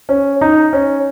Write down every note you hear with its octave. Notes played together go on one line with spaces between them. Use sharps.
C#4
D#4
C#4